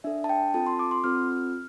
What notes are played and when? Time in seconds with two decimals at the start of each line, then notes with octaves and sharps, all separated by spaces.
0.04 D4 A4 E5
0.24 A5
0.29 G5
0.54 C4 F4 A4 A5
0.66 C6
0.79 D6
0.91 C6
1.04 C4 F4 A4 F6